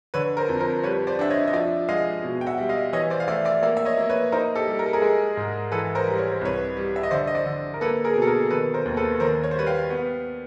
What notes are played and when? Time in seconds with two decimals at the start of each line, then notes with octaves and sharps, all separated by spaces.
0.14 D3 B4 C#5
0.37 A#4 C5
0.49 F2
0.60 A#4 C5
0.84 G3 B4 C#5
1.07 C5 D5
1.19 D4 E5
1.30 C#5 D#5
1.47 D#5
1.53 F3 D5 E5
1.89 G#3 D#5 F5
2.23 B2
2.41 G5
2.46 E5 F#5
2.58 G3
2.69 D#5 F5
2.93 E3 C#5 D#5
3.10 C5 D5
3.20 F5
3.28 A3 D5 E5
3.45 D5 E5
3.63 A#3 D5 E5
3.77 E5
3.85 C#5 D#5
3.97 A#3
4.10 B4 C#5
4.32 D#4 A#4 C5
4.55 G4 A4
4.67 G3
4.79 A#4
4.86 A4
4.93 G#4 A#4
5.02 G#3
5.37 G#2
5.72 E3 A4 B4
5.95 A#4 C5
6.07 G3
6.19 C#5
6.32 C5
6.41 C2 B4 C#5
6.77 G3
6.96 E5
7.03 D#5
7.11 D3 C5 D5
7.27 D#5
7.35 C5 D5
7.46 D3
7.74 A#4
7.81 A#3 A4 B4
8.04 G#4 A#4
8.16 B2
8.22 A4
8.27 G#4 A#4
8.50 D#3 A4 B4
8.74 A#4 C5
8.85 D#2
8.97 A4 B4
9.20 D#3 A#4 C5
9.43 C#5
9.51 C5
9.56 G3 B4 C#5
9.67 F5 G5
9.90 B3